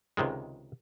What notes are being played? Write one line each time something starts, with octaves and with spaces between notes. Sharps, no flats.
C#2 C3 D#3 G#3